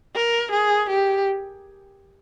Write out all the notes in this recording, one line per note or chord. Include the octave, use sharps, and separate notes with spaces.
A#4
G#4
G4